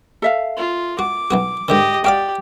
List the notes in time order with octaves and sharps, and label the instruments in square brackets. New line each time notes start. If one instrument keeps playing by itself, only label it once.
[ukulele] A4 E5 F5
[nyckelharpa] F4
[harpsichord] F#4 [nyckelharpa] D6
[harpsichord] B1 B3 F#4
[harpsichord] G#2 D3 D#3 [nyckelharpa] G4 D#5
[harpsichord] F#4 F5 D6 [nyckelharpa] G4 [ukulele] D5 G5